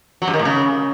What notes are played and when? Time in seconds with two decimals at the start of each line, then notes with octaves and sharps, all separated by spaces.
0.22 F#3
0.28 G2
0.34 D#3
0.39 A2
0.45 C#3